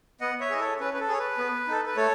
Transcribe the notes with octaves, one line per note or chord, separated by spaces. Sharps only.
B3 D#5 F#5
C#5 E5
E4 G#4 D#5
A4 C#5
C#4 B4
B4
A4
G#4 C#5
B4
B3
D#4 A4
B4
A3 A4 C#5